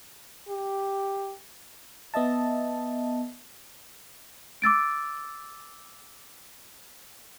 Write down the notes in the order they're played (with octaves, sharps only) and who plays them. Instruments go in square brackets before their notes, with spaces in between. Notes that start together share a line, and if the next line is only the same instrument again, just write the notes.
[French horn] G4
[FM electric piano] B3 D#5 E5 A5
[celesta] D6 E6 A6 D7